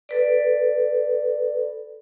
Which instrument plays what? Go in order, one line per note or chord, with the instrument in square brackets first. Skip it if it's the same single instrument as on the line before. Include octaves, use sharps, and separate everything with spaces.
[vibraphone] A4 B4 D5